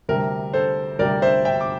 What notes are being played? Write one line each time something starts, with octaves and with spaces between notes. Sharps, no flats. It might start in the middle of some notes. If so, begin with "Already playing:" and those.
D2 C3 G3 A#4
A4 C5
D2 C3 G3 A#4 D5
C5 E5
E5 G5
D6